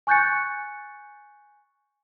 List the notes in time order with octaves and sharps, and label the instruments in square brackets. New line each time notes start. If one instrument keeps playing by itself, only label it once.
[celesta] G#5 C#6 F#6 G6 A6 C#7